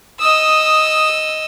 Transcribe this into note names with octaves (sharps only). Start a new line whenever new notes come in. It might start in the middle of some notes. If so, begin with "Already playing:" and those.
D#5 D#6 E6